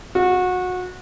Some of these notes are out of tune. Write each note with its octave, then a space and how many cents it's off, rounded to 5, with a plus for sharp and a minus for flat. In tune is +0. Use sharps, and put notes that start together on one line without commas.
F#4 -25